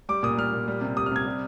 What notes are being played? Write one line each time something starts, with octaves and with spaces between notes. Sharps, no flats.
G3 D6
A#2 D#6
G3 F6
A#2
G3
C3
G3 D#6
F6
C3 G#6
G3